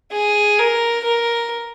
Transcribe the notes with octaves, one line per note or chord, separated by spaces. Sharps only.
G#4
A#4
A#4